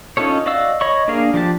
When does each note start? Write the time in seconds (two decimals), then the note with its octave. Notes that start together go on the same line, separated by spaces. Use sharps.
0.17 C#4 D#4 F4 A4 C#5
0.46 F#4 D5 D#5 F5 E6
0.81 C#5 D#5 B5 C#6
1.08 A#3 D4 G#4 A#4 F5
1.34 F3 D4 G4 A5